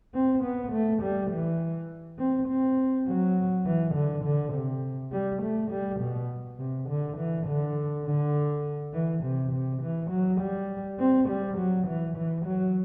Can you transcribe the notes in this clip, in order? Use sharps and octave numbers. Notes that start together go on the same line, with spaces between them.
C4
B3
A3
G3
E3
C4
C4
F#3
E3
D3
D3
C3
G3
A3
G3
B2
C3
D3
E3
D3
D3
E3
C3
C3
E3
F#3
G3
C4
G3
F#3
E3
E3
F#3